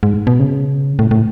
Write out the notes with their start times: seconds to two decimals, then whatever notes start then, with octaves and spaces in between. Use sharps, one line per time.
0.03 G#2
0.27 B2
0.40 C#3
0.99 A2
1.11 A2